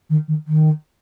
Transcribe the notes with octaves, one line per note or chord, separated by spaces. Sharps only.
D#3
D#3
D#3